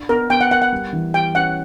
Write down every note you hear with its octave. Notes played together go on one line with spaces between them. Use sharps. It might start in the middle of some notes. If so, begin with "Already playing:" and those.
Already playing: D4
B3 A#4
B3 G5
F#5
A#4 F#5
F#5
G3
E3
G4 G5
C#4 F#5